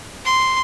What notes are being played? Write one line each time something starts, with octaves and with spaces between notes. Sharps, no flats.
C6